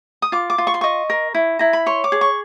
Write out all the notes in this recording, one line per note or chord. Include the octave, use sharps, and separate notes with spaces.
D#6
F4 D6
D6
F4
C#6
C6
D#5 C#6
A#4
E4
E4 A#5
B5
C#5 C6
D6
G#4
C#6